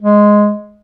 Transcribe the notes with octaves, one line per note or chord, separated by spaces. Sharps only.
G#3